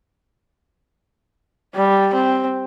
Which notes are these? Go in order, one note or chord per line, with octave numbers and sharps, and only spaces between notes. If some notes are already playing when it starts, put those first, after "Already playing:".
G3
C4